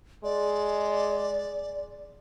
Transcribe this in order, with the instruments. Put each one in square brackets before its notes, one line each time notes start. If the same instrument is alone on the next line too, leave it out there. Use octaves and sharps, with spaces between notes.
[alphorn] G#3 [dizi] D5